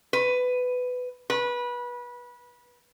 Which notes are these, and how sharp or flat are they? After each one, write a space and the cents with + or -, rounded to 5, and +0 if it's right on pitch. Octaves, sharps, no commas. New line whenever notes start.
B4 +15
B4 -25